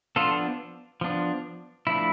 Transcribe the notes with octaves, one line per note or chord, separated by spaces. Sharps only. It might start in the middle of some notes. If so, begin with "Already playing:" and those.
F3 B3 D4 F4 A4
F3 B3 D4
F3 A3 D4 E4